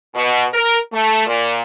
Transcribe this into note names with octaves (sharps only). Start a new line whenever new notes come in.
B2
A#4
A3
A#2